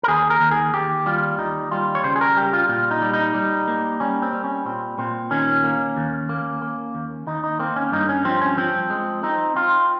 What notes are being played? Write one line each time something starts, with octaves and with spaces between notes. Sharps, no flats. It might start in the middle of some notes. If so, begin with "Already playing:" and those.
A#4
D#2 G#4
A#4
D#2
G#4
D#2 G4
G3 F4
D#2 D#4
G3 F4
C#5
C#3 C5
G#4
A#4
G3 G4
F4
A#2 F4
D#4
G3
D#4
G3
A#3
G3 C#4
C4
G3
C#4
A#2 C4
A#2 C4
D#3 C#4
A#3
D#2
A#3
A#3
D#2
D#2 D#4
D#4
A#3 C4
C#4
G2 D#4
C#4
F3 C4
C#4
F3 C4
G#3
C4 D#4
C4 F4